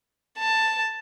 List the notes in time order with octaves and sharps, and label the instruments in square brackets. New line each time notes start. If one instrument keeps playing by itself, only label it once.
[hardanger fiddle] A5